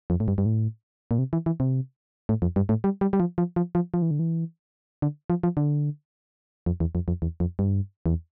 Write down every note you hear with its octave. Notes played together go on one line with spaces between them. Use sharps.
F2
A2
G2
G2
A2
A#2
C3
E3
E3
C3
A2
F2
G2
A2
G3
G3
G3
F3
F3
F3
F3
F3
E3
D3
E3
D3
F3
F3
D3
F2
E2
F2
F2
E2
F2
G2
E2